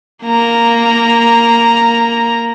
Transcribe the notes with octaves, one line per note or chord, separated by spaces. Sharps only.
A#3 A#5